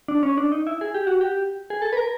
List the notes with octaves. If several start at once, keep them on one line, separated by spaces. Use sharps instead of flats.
D4
C#4
D4
D#4
E4
G#4
G4
F#4
G4
G#4
A4
B4
A#4